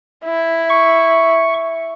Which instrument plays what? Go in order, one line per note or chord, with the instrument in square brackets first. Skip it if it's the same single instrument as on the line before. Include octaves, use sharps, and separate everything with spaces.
[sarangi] E4
[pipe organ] C#6